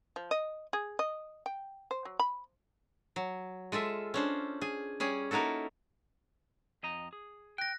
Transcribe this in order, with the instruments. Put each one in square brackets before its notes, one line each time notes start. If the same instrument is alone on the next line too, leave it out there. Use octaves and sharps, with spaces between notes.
[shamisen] F3
D#5
G#4
D#5
G5
C5
F#3
B5
[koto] F#3
G#3 F4 A4 E5
C#4 D4 C5
G#4 G#5
G3 C#4 G#4
A#3 D#4 E4 F#4 A4
[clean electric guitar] F2 D#5 A#5
G#4
[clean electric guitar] G5 [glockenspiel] F#6 A#6